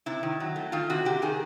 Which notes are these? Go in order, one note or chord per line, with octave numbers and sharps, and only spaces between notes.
C3 E4
D#3
F#3
A3
D#3 F4
C3 F#4
C3 G4
D#3 G#4